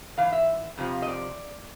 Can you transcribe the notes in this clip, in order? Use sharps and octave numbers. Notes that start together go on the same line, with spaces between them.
G#2 E3 F5
E5
F2 C3 F3
D#5
D5